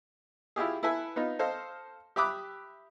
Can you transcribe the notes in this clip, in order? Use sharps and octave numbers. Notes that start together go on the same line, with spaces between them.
E4 F4 G4 G#4
E4 A4 B4 E5 G#5
B3 D#4 F4 D#5
A4 C5 D#5 F5
G4 E5 B5 D6 D#6 F#6